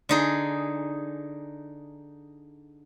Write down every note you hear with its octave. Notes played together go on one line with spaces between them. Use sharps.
D3 D#4 G#4